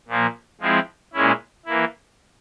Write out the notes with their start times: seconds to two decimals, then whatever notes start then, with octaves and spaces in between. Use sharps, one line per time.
0.08 A#2 F3 A#3
0.61 F3 G#3 C4 E4
1.13 A#2 G#3 C#4 E4
1.66 E3 A#3 E4